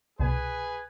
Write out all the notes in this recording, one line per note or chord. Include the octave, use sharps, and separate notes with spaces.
C2 B2 G#4 B4 G#5